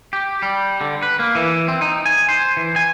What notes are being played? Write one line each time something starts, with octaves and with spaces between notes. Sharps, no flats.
G4
G3
D3
B4
A#3
E3
C4
D#4
G#5
C5
E3
G#5